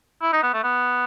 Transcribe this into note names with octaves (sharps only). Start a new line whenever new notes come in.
E4
D#4
B3
A3
B3